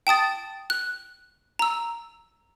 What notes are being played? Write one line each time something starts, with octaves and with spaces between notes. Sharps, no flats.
G5 A5 D#6 A6
F#6
A#5 E6